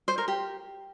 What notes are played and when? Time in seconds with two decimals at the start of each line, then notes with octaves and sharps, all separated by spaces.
0.08 C5
0.18 A#4
0.28 G4